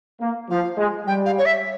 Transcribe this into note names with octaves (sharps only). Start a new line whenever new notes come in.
A#3
F3 F5
G#3
G3 G5
F5
C#5
E5